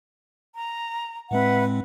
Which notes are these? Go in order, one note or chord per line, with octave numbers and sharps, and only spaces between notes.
A#5
A2 G#3 C4 B4 E5 F#5